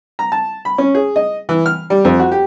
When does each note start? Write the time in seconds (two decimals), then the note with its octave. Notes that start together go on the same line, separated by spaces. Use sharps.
0.19 A#5
0.32 A5
0.65 B5
0.78 C#4
0.95 G#4
1.16 D#5
1.49 E3
1.66 F6
1.90 G3
2.05 F2
2.20 F#4
2.32 G4